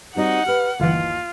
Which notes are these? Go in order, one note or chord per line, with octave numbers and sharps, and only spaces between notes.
G3 C4 D#4 F#4 F#5
G4 B4 F6
G1 D#2 E3 F4